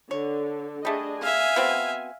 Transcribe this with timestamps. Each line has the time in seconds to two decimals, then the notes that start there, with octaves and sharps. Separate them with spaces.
0.11 D3 C#5
0.85 G3 A3 D4 G#4 D#5
1.22 E5 F5 G#5
1.56 B3 C4 F#4